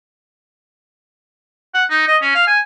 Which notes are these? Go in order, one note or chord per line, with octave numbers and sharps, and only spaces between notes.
F#5
D#4
D#5
C#4
F5
G#5